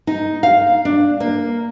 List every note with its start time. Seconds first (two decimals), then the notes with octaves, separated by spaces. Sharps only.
0.07 D#4
0.43 F5
0.85 D4
1.20 A#3